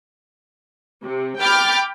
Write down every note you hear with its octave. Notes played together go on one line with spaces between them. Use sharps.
C3
G5 B5 D6 F6 G6 A6